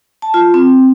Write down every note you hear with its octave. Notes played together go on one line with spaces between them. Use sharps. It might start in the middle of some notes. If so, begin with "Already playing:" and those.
A5
F4
C4